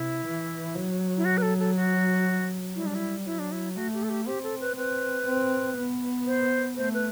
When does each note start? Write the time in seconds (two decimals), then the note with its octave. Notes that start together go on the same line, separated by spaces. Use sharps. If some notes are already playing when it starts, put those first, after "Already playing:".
Already playing: C3 E4
0.25 E3
0.75 F#3
1.17 E4
1.25 F#4
1.37 B4
1.42 A4
1.59 A4
1.76 F#4
2.75 G3 E4
2.86 D4
2.95 E4
3.26 F#3 E4
3.39 D4
3.52 E4
3.76 A3 F#4
3.93 G4
4.03 A4
4.09 G4
4.27 C4 G4
4.43 A4
4.60 B4
4.76 C4 B4
5.26 C4
5.77 B3
6.27 C5
6.77 A3 C5
6.94 B4